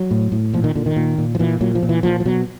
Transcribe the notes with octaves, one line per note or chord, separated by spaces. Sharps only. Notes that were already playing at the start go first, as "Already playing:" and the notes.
Already playing: F#3
A2
A2
A#2 F3
D#3
A#2 D3
D#3
A#2
A#2
F3
A#2 E3
A#2 F#3
F3
A#2
E3
A#2 F3
F3
B2 F#3